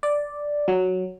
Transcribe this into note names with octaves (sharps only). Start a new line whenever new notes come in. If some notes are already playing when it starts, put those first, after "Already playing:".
D5
F#3